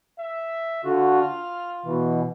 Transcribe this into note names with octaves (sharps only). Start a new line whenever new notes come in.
E5
D3 F4 F#4
F6
B2 E3